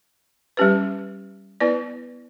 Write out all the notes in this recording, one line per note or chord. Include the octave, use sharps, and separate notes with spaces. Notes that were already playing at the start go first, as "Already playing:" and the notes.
G3 C#4 G4 B4
B3 E4 B4 D5